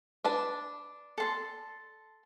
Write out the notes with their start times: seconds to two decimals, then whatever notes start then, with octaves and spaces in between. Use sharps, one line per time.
0.24 D4 B4 A5
1.18 A4 C6